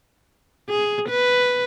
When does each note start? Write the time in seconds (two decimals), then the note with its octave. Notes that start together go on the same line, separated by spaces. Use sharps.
0.69 G#4
1.09 B4